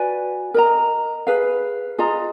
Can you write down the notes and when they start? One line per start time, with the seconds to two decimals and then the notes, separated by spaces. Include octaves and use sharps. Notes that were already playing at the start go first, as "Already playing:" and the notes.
Already playing: F#4 B4 D5 G#5
0.54 A#4 D#5 A#5
1.27 G#4 B4 F5
1.98 F4 G#4 D#5 A#5